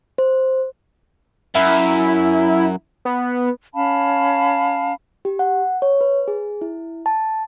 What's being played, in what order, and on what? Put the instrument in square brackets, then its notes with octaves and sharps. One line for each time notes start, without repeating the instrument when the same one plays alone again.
[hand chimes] C5
[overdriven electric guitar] F#2 [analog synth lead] E4
[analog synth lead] B3
[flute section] C#4 F5 A5 B5
[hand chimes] G4
F#5
C#5
B4
G#4
E4
A5